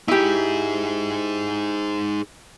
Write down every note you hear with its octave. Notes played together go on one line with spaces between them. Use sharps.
D#4 E4 G4 G#4